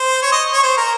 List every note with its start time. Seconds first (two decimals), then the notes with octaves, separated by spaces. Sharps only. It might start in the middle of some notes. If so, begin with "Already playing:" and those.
Already playing: C5
0.23 C#5
0.32 D#5
0.53 C#5
0.63 C5
0.78 A#4